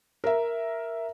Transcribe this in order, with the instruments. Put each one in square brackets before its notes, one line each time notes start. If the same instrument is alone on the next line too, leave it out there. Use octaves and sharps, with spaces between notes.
[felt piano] A#4 E5